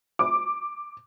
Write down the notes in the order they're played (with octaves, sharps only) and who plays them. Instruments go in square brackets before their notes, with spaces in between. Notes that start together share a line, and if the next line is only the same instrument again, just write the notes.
[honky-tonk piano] D6